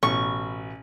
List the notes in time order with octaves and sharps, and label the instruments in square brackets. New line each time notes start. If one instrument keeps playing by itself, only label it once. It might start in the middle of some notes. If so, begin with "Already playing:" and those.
[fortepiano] A1 B2 [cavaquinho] C#6